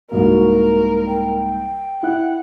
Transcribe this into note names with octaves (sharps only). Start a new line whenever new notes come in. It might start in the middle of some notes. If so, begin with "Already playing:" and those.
C2 G#2 A#3 F#4 A#4
G5
E4 F#5 F#6